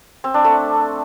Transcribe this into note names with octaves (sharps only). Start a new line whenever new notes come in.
C4
D4
A3